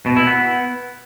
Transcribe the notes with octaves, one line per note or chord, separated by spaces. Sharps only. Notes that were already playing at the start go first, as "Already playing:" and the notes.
B2
E4
B3